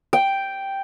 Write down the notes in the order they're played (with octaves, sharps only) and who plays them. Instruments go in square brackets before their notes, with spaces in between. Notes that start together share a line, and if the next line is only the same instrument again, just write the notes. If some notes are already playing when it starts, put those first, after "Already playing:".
[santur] G5